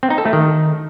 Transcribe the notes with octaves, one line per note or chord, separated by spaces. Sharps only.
C4
D#4
A4
A3
D#3